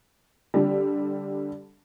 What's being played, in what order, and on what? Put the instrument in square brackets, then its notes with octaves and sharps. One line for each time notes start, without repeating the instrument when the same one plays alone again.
[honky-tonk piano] D3 G3